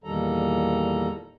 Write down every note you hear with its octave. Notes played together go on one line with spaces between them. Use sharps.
E2 A#2 D#3 G3 A4 A#5